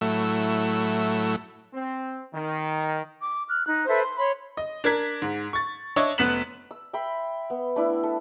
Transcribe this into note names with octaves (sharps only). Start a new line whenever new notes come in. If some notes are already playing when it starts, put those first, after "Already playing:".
A2 F#3 A3 E4
C4
D#3
D6
F6 F#6
D#4 F#6
A4 B4 C5 E5
C6
C#5 B5 C6
D#5
D4 A#4 G#6 B6
G#2
C#6 A6
D4 C#5 D#5 E5 C#6
F1 B3 F#6 B6 E7 F#7
E6
E5 G5 B5 C6
B3
A3 D4 E4
A4